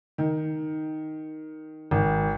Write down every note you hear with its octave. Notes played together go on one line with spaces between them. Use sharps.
D#3
G#1